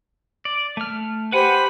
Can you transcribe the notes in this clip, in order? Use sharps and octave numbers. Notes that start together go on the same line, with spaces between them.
D5
A3 F6
G4 B4 C5 F#5 G#5 B5